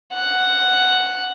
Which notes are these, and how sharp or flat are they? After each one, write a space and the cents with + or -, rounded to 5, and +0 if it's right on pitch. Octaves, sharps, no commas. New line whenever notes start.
F#5 +5